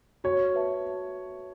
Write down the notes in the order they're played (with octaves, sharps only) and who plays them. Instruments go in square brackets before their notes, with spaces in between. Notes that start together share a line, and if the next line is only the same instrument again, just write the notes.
[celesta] F#4 [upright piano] C#5
[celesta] B4 E5 A5